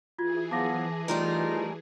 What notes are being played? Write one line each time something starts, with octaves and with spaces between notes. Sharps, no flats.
E3 F4 F#4 G#4 G#6
F3 F#3 B3 A5 D6 A#6
G3 A3 D#4 F4 A#4